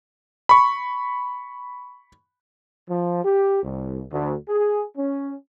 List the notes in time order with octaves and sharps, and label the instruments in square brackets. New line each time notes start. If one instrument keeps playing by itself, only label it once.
[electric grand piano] B5 C#6
[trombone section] F3
G4
C2
D2
G#4
C#4